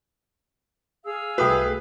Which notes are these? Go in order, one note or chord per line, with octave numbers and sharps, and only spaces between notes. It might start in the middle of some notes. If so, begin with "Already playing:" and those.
G#4 F5 E6
C2 A3 F#4 B4 G5 D#6